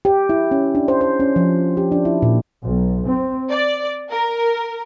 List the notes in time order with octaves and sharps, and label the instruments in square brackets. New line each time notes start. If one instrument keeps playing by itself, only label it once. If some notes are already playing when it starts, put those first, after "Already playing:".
[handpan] G4
E4
C#4
D4
C5
C5
C#4
F3
G4
D4
E4
A#2
[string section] B1
C4
D5
A#4